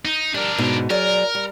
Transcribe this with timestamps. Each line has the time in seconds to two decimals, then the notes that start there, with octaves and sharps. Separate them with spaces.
0.05 D#4
0.34 G3 D4 A#4
0.58 G#2 B2 D#4
0.90 F#3 G#4 A#4 D5
1.35 G3